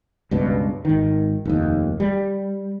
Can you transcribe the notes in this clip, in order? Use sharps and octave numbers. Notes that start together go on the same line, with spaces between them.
C#2 G2 B2
G#1 D#3
F1 D#2
G3